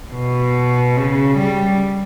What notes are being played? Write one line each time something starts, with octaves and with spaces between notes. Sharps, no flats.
B2
C#3
G3